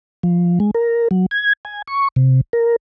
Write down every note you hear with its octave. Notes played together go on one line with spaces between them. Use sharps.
F3
G#3
A#4
F#3
G#6
G#5
C#6
C3
A#4